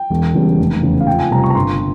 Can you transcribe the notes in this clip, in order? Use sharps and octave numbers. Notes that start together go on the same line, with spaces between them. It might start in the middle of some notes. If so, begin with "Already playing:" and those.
Already playing: G5
E1
E2 C#3 G3
F1
E2 C#3
F5
F2 G5
G#5
C3 G3 C4 A#5
C#6
A#5
G1 C6